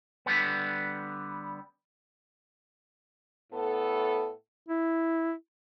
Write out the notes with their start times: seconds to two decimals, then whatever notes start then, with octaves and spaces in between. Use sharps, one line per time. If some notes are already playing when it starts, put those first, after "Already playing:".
0.26 D3 G3 B3
3.52 A2 B3 A4
4.68 E4